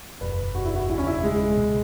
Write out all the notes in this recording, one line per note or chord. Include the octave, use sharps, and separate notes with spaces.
F#1 E2 B2 B4
F#4
E4
F#4
F#1 E2 B2 E4
C#4
E4
G#3
C#2 B2 B3